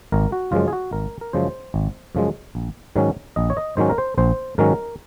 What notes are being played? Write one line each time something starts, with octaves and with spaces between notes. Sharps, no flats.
G#1 A#4
F#4
F#2 C#3 F3 G#3 F4
G#4
F#4
G#1 A#4
A#4
F#2 C#3 F3 G#3 C5
G#1
F#2 C#3 F3 G#3
A#1
G#2 D#3 F#3 C#4
A#1 D#5
C#5
D#5
G#2 D#3 F#3 C#4 C5
A#4
C5
A#1 C5
G#2 D#3 F#3 C#4 A#4